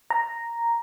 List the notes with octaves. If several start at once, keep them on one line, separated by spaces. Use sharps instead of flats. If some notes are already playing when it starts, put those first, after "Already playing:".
A#5